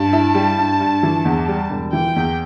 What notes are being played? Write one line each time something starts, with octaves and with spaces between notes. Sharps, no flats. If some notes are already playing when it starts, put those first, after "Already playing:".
Already playing: G2 A5
E4
G3
G2
G2
E3
E2
G3
E1
E3 G5
E2